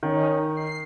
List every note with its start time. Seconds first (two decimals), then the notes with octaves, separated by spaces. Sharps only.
0.03 D#3 C#4 D#4
0.56 C7